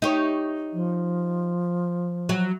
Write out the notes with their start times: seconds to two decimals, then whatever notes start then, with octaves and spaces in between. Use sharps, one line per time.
0.02 D#4 G4 C#5
0.73 F3
2.29 F#3